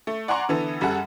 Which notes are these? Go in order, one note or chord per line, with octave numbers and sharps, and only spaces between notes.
A3
D5 F#5 G#5 A#5 C6 C#6
D3 E3 B3 A4
F#2 G3 G#4 A4 F#5